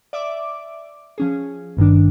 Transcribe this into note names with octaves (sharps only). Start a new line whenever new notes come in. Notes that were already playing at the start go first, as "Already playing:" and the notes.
D5 E5 D6
F3 C#4 G#4
G#1 G2 D#3 D4